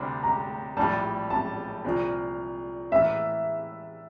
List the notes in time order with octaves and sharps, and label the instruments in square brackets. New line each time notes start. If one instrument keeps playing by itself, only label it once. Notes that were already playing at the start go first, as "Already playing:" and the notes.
Already playing: [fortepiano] D2 C3 G3 D4
[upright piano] A#5
[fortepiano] A#1 A2 G3 [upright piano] A5
[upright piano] A5
[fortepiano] C2 A#2 F3
[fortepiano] A2 E3 A#3 [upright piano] E5